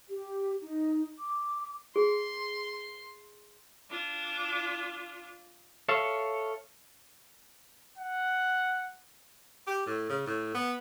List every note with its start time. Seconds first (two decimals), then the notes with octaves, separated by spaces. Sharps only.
0.08 G4
0.61 D#4
1.19 D6
1.96 G#4 C6
3.90 D4 F4
5.88 A4 C#5 E5 F5
7.98 F#5
9.67 G4
9.86 A2
10.09 C#3
10.27 A2
10.55 B3